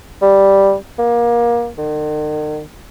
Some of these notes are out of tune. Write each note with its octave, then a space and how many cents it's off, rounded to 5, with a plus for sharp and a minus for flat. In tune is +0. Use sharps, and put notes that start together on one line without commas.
G3 +0
A#3 +25
D#3 -45